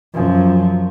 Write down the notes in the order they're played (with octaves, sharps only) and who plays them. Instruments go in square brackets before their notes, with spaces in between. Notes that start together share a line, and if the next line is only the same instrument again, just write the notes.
[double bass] F#2 F3